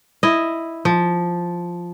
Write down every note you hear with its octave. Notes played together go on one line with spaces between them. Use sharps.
E4 D#5
F3